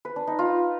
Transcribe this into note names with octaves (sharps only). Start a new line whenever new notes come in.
B4
D4
D#4
F4